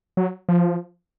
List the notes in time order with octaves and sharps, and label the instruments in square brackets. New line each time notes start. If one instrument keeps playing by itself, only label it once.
[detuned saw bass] F#3
F3